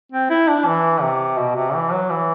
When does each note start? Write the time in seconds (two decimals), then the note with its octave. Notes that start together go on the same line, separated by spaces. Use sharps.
0.12 C4
0.30 E4
0.48 D4
0.67 E3
1.01 C3
1.38 B2
1.56 C3
1.75 E3
1.92 F#3
2.10 E3